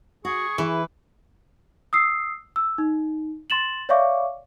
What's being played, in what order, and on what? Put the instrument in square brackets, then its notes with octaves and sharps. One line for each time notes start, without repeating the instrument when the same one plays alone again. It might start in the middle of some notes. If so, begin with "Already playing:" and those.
[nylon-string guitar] F#4 [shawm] G#4 [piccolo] C#6
[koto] E3 [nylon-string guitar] E4 G#4 [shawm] B4
[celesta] D#6 E6 C7
E6
D#4
C6 A6 E7 F#7
C#5 D5 E5 F5 C#6 D6